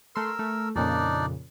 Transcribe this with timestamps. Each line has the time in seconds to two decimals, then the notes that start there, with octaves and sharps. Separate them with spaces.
0.16 A3 A#4 C6 E6
0.39 A3
0.76 F2 A#2 C#3 D4 D#4 D5